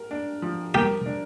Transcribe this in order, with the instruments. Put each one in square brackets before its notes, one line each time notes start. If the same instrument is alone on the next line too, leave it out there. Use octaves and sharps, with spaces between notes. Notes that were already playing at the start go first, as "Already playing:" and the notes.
Already playing: [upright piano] A#4
D4
F3
[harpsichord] G4 [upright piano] A#4
[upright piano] D4